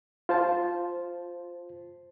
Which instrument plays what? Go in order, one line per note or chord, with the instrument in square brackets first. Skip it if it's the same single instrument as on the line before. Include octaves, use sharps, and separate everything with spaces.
[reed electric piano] F4 C5 A5